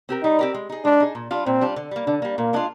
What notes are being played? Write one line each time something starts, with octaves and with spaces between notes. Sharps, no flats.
C4 G4 A#4
G3 D#4
C4 G4 A#4
G#3
D#4 G#4
G#3 D4
D#4 G#4
A#2
G3 D4 F4
A#2 C4
G3 D4 F4
D3
G3 A#3
D3 D4
G3 A#3
A#2 A#3
G#3 D4 F4